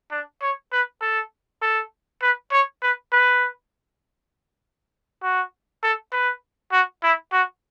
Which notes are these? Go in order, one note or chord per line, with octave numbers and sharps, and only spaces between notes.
D4
C#5
B4
A4
A4
B4
C#5
B4
B4
F#4
A4
B4
F#4
E4
F#4